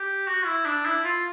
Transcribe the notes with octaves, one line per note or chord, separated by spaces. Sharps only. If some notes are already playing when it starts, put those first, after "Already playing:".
Already playing: G4
F#4
E4
D4
E4
F4